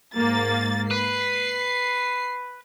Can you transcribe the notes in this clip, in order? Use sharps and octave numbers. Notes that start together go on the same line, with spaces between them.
G#2 A#3 A6
B4 C7